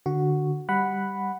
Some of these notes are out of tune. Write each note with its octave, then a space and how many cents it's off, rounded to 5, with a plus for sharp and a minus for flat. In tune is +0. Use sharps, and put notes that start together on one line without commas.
D3 +10 F#4 +0
G3 +0 F#5 +0 B5 +0